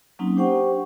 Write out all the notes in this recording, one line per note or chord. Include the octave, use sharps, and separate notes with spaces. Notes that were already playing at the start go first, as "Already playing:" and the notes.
F#3 A#3 C4 C#4 D#4
D4 G4 C5 F#5 G5 C#6